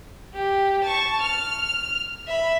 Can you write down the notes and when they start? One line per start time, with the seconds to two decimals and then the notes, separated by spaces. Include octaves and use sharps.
0.33 G4
0.84 A5 C#6
1.21 F6
2.27 E5 B5